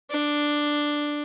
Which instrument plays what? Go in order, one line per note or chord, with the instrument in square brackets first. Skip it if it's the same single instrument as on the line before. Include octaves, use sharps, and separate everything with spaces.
[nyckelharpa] D4